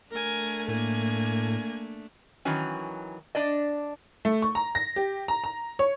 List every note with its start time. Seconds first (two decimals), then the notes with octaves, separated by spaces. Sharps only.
0.11 A3 D4 A#4 G#5
0.68 A2 A#3 G#5
2.45 D#3 E3 F#3 C#4
3.35 D4 D5 D#5
4.25 A3
4.42 C#6
4.55 A#5
4.75 A#6
4.96 G4
5.28 A#5
5.44 A#5
5.79 C#5